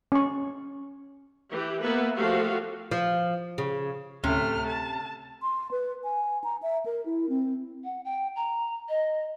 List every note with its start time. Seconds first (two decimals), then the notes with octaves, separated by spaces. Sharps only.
0.12 C#4 C#6
1.53 E3 G4
1.83 A#3 B3 B4 E5
2.17 F3 A3 F#4 G4 A4 F5
2.91 F3
3.58 C#3
4.24 D2 A2 C3 A3 C#4 F6
4.67 A5
5.42 C6
5.71 B4
6.04 G#5
6.44 A#5
6.62 E5
6.86 A#4
7.06 E4
7.29 C4
7.84 F#5
8.05 G5
8.36 A#5
8.89 D#5